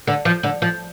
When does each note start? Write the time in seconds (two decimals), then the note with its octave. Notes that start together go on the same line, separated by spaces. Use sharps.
0.07 D3
0.25 F3
0.43 D3
0.62 F3